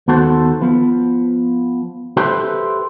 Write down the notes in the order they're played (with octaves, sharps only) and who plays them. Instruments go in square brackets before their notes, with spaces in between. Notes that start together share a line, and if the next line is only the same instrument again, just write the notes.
[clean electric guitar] D#2 B3 F#4 A4 C5
F3 B3
G4 A4 B4 C5 E5 G5